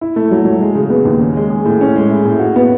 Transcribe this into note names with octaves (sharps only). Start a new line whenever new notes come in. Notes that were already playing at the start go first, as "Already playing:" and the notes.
E4
A3
F#3
F#3
G#3
C#3
B3
D#2
C#4
G#3
G#4
A2
C#4
G#3
E4
A2
F#4
B3